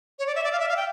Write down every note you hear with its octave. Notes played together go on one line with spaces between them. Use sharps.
C#5
D5
E5
D5
F5
E5
F5
G5